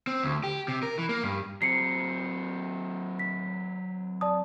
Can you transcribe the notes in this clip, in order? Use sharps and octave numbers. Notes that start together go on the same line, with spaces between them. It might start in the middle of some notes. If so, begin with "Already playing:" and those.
C4
D2
G4
C3
A#4
E3
A#3
G2
F#3 C4 C7 C#7
B6
D5 A5 D#6